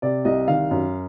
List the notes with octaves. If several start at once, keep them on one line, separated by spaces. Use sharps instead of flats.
C3 D5
C2 D#5
D#3 F5
F#2